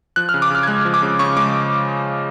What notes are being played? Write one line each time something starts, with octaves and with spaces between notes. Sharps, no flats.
F3 F#6
F6
C#3
D6
C#3 F6
G#6
G#3 F#6
F3
D6
C#3
C#3 C#6
G#3 D6